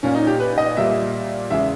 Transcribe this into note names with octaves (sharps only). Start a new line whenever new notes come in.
A#2 A#3 C#4
D#4
G4
B4
D#5
A#2 G3 A#3 E5
E2 C#3 G#3 E5